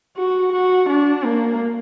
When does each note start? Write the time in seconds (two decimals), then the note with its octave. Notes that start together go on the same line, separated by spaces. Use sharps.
0.17 F#4
0.53 F#4
0.89 D4
1.25 A#3